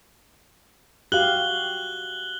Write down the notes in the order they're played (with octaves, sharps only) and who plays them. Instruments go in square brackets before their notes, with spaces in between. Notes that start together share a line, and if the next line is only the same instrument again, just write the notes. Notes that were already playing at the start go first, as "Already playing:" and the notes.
[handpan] F#4 G4 F5 [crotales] F#6 F#7 G7